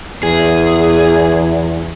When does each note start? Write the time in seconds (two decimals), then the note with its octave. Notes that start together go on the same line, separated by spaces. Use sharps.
0.23 E2 G#4